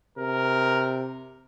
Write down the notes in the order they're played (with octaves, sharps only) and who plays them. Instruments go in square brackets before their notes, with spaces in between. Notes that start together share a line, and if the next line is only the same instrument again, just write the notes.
[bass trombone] C3 [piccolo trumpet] A#4